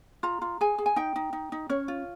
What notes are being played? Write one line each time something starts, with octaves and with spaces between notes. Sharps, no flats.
F4 A#5
F4
G#4 G#5
G#4
G#5
D#4 G5
D#4
D#4
D#4
C#4 C#5
F4